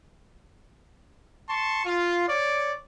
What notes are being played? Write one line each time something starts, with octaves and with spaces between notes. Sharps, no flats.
A5 C6 C#6
F4
C#5 D5